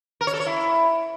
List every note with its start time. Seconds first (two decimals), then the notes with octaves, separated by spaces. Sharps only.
0.21 A#4
0.27 C#5
0.33 A4
0.40 C#5
0.46 E4